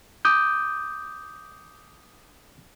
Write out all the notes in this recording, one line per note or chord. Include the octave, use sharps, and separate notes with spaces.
D6 D#6 G6